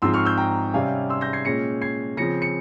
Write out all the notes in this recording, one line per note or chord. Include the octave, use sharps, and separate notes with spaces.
G#2 F3 C4 C6 E6
C#6 F6
E6 G6
G5 A#5
C3 G3 C#4 F5 G#5
C6 E6
G6 A#6
G#6 C7
A#2 G#3 C#4 A#6 C#7
G#6 C7
C#3 F3 C4 A#6 C#7
C#7